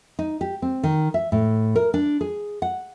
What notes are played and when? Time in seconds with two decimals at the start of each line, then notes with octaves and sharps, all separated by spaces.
0.19 D#4
0.41 G4
0.62 C4
0.83 D#3
1.14 E5
1.32 A2
1.76 A#4
1.94 D4
2.21 G#4
2.62 F#5